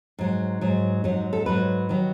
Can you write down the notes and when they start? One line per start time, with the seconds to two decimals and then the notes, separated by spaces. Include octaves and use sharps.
0.19 G#2 F#3
0.61 G#2 F#3
1.04 G#2 F#3 D#4
1.33 A4
1.46 G#2 F#3 B4
1.89 D#3 F#3